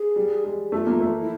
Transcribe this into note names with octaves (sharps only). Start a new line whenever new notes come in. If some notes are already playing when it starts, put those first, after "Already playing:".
Already playing: G#4
G3
G#3
A3 F4 F#4
A#3
A3
E4